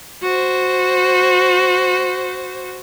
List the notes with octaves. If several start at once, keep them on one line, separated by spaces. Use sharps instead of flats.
F#4 C5